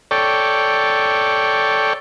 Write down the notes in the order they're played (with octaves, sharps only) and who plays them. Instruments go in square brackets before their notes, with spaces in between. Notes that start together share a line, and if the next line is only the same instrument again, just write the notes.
[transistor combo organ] A4 C#5 D5 G5